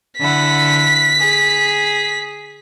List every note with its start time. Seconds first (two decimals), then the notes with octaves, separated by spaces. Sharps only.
0.18 D3 E4 F#5 B6
1.18 G#4